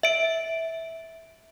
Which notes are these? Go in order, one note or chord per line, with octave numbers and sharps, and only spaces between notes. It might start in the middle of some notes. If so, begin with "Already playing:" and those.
E5 D7